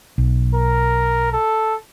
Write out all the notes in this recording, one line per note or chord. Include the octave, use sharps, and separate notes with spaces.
B1
A#4
A4